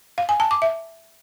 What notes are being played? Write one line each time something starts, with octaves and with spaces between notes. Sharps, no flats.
F5
G#5
A5
D6
E5